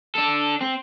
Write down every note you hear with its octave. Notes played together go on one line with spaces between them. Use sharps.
D4 A4
C4